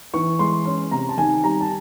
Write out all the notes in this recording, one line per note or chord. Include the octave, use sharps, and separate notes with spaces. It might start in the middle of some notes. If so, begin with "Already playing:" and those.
E3 C#6
G#3 C6
C#4
C3 A#5
A5
D#3 G#5
G3 A#5
A5